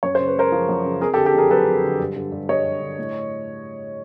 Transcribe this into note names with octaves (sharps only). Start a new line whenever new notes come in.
F#2 C#5
C#3 C5
B4
G#3 A#4 C5
F3
F#2
C#3
F2 G#4 A#4
G4 A4
D3
G4 A4
F2 G#4 A#4
F#3 A4 B4
F2
D3
G2
D3
G2
G3 C#5 D#5
G2
D3
A2